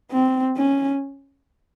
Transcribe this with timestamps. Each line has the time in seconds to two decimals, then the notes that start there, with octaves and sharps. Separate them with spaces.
0.11 C4
0.57 C#4